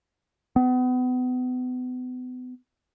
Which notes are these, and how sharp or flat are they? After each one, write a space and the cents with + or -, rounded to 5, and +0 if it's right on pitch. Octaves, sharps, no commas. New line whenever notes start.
B3 +35